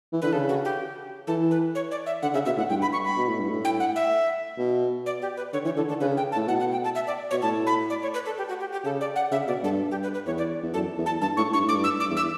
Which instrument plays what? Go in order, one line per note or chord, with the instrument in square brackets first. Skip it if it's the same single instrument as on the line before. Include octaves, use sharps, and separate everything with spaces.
[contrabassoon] E3
[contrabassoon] D3 [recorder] B4
[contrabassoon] C#3 [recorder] A4
[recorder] F#4
G4
[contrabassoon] E3 [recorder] A4
[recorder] B4
C#5
D5
E5
[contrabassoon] D3 [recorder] F#5
[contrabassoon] C#3 [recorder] E5
[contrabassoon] B2 [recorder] E5
[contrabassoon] A2 [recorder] F#5
[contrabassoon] G2 [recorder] G5
[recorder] B5
C#6
B5
[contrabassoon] B2
A2
G2
A2
[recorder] G5
F#5
E5
[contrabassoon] B2
[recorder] D5
G4
B4
[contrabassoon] D3 [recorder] C#5
[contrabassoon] E3 [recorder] C#5
[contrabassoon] D3 [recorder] A4
[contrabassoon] D3 [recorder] A4
[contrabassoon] C#3 [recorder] B4
[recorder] G5
A5
[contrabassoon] A2
[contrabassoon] B2 [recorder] F#5
[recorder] F#5
G5
A5
E5
D5
[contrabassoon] B2 [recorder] C#5
[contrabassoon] A2 [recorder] A5
[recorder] B5
D5
C#5
B4
A4
G4
F#4
G4
G4
[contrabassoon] C#3 [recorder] A4
[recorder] D5
F#5
[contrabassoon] C#3 [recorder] E5
[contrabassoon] B2 [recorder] D5
[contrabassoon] G2 [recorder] A4
[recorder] G4
B4
B4
[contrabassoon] E2 [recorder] C#5
[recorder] D5
[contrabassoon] E2
[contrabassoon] F#2 [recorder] A4
[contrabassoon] E2
[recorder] A5
[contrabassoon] G2 [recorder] A5
[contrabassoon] A2 [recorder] C#6
[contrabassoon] G2 [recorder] C#6
[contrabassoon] A2 [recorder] D6
[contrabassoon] G2
[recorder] E6
D6
[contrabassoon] E2
[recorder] E6